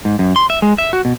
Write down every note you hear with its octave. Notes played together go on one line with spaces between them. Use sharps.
G#2
F#2
C6
E5
G#3
E5
F#4
B2